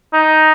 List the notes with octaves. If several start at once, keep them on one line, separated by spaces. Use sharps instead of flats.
D#4